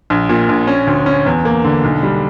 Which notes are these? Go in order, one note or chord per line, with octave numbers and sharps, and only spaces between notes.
A#1
A#2
A#1
C#4
D2
C#4
E2
A#3
D3
B1
G3